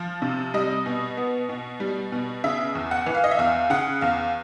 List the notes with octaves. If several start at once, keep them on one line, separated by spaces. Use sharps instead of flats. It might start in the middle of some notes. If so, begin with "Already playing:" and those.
Already playing: F3
C3
G3 D#5
B2
B3
B2
G3
B2
C#3 E5
E2
F#5
E3
F5
D#5
E5
E2 F5
C#3 F#5
E2 F5